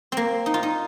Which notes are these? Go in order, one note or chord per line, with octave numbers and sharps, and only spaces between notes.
A#3 C4
D#4
F4
D#4